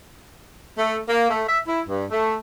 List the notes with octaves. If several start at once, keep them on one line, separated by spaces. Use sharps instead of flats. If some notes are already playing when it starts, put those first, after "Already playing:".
A3
A#3
A3
E5
E4
G2
A3